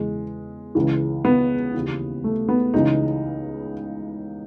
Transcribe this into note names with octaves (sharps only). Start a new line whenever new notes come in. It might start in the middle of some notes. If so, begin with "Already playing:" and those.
Already playing: E2 C#3 E3 G#3
C#2 C#3 E3
B3
D#2 C#3 E3
A3
B3
C#2 C#3 E3 D#4